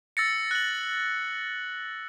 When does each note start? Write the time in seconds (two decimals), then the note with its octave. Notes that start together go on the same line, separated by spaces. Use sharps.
0.17 E6 A6 A#6 C#7
0.51 F#6 F#7